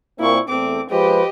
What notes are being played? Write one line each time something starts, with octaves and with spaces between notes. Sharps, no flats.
A#2 A#3 C4 E4 C#6
E2 A3 C4 D6
F3 G#3 G4 B4 D#5